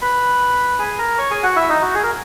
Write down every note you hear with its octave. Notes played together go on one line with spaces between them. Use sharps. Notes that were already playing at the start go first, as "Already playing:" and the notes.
B4 B5
G#4 G#5
A#4 A#5
C#5 C#6
G#4 G#5
F#4 F#5
E4 E5
D#4 D#5
F#4
G#4
A#4